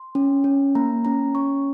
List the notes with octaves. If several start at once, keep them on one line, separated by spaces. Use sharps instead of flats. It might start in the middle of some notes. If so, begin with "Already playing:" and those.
Already playing: C6
C#4
C#4
A#3 A#5
C#4 A#5
C#4 C#6